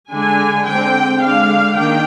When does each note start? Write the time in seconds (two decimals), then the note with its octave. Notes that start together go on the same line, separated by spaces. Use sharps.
0.12 D3 G#3 D4 G#5
0.66 D3 G#3 C4 G5
1.21 D3 G#3 D4 F5
1.76 D#3 A#3 D4 G5